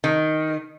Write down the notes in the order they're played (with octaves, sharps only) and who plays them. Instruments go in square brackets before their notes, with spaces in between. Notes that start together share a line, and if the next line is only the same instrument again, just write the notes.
[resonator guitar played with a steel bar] D#3